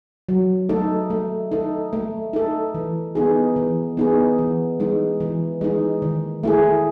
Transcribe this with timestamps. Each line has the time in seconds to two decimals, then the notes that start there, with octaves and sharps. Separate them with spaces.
0.29 F#3
0.69 A3 D#4 A4
1.10 A3
1.52 D#4 A4
1.93 A3
2.33 D#4 A4
2.75 E3
3.15 B3 D#4 G#4
3.56 E3
3.97 B3 D#4 G#4
4.39 E3
4.80 G#3 D#4
5.20 E3
5.61 G#3 D#4
6.02 D#3
6.43 A3 E4 G#4